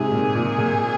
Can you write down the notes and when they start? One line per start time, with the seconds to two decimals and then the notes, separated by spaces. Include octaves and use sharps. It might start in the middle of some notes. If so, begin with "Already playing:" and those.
Already playing: G#2 C3 G#4
0.11 A#2
0.35 A#2
0.58 A#2